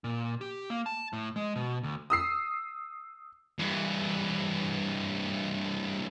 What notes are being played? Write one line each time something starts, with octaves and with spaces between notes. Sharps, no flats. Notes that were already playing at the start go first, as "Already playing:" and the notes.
A#2
G4
A#3
A5
A2
G#3
B2
D2
D#6 E6 C7
G2 E3